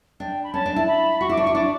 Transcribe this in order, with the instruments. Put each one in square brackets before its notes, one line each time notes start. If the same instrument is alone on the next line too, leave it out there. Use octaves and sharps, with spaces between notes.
[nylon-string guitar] D4 [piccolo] G5
[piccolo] B5
[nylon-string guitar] C#4 [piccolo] A5
[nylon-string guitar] D4
E4
[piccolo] B5
[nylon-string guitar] F#4 [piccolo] C#6
[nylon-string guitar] E4 [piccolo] D6
[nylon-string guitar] D4
[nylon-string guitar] E4 [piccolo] C#6
[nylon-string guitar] D4 [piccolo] D6